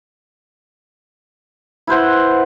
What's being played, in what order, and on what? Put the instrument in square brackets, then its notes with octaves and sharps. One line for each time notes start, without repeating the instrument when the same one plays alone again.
[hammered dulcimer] E4 B4 C5 F#5